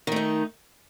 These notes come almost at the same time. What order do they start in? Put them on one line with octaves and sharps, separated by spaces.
D#3 A3 D#4